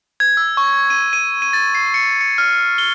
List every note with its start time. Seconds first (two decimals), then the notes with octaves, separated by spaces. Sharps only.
0.20 G#6
0.37 E6
0.57 C#6
0.90 D#7
1.13 D#7
1.42 D#7
1.53 A6
1.75 C7
1.94 C#7
2.21 C#7
2.38 F6
2.78 G7